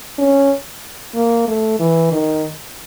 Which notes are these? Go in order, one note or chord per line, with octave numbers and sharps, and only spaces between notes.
C#4
A#3
A3
E3
D#3